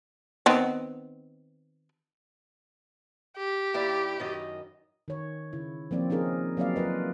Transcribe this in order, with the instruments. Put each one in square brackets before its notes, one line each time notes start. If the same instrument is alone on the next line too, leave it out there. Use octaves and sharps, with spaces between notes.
[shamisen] D#3 B3 C4
[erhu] G4
[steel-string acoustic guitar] D#2 E4 D5
F#2 D#3 D#5
[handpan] D#3 C#5
C#3 E4
F3 A#3 C4 D5
C4 C#4 D#4 G#4 A#4
F#3 A#3 C4 D5 E5 F5
F#3 F4 A#4 B4 D#5